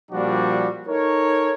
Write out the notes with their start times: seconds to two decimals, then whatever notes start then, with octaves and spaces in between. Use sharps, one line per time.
0.12 A#2 F3 G3 D4 F#4
0.87 D#4 A4 A#4 C#5